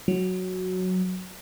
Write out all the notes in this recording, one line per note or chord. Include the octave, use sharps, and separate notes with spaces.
F#3